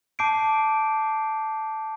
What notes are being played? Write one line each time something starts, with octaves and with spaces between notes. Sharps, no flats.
A5 D6 G6 C7 D7